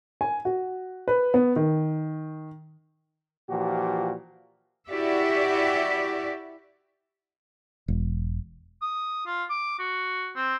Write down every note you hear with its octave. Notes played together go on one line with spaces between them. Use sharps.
G#5
F#4
B4
B3
D#3
A#2 E3 F3 F#4 G4
E4 F#4 G4 D5 E5
E1
D#6
F4
D6
F#4
C4